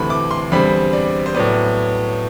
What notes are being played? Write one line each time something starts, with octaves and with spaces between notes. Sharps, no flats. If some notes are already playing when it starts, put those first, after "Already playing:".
Already playing: D2 C3 E3 A3 B5
D6
C6
E2 D3 G3 C4 B5
D5
C5
A2 F#3 B3 D5